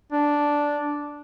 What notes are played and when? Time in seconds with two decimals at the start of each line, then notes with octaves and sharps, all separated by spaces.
0.12 D4